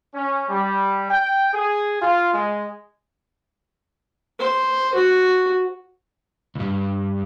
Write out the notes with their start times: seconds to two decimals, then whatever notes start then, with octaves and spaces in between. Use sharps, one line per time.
0.14 C#4
0.49 G3
1.10 G5
1.53 G#4
2.02 F4
2.33 G#3
4.39 C5
4.94 F#4
6.55 C#2 G2